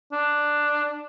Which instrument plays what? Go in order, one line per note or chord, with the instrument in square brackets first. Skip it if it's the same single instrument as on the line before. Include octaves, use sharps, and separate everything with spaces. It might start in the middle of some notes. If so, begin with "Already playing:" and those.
[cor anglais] D4